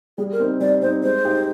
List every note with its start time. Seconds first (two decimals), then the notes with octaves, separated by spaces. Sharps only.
0.18 G3 G#4
0.32 A#4
0.40 C4 D#4
0.60 G3 D5
0.82 C4 D#4 C5
1.03 G#3 C5
1.25 D#4 G4